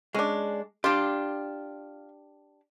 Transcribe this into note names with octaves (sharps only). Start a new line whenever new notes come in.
G#3 C#4 D4
D4 F4 G4